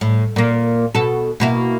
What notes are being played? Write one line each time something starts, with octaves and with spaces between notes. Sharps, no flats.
A2
A#2 A#3
B2 A4
B2 A#3 E4